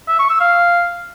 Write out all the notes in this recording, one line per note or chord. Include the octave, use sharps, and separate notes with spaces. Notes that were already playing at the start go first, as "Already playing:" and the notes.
E5
C#6
E6
F5